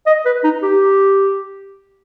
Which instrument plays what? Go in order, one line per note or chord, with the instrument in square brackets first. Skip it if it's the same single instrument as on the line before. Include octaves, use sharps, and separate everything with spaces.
[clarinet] D#5
B4
D#4
G4